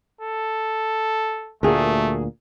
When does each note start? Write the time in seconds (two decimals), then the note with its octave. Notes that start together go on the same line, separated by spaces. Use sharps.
0.21 A4
1.63 D2 A#2 A3 F#4 G#4 A#4